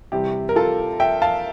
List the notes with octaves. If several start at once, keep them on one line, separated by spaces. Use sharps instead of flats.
C3 E3 G3 G4
A#4
F4 A4
E5 G5
F5 A5